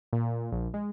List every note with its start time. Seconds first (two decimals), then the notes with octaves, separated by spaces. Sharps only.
0.13 A#2
0.52 A#1
0.74 G#3